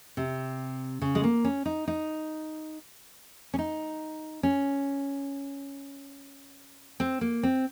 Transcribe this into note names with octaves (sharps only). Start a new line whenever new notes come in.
C3
C#3
G#3
A#3
C#4
D#4
D#4
C#4
D#4
C#4
C4
A#3
C4